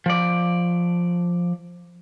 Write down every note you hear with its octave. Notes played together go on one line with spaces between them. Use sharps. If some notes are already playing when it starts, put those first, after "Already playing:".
F3 D5